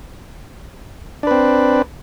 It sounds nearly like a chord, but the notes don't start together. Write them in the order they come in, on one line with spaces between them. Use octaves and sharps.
D4 B4 C4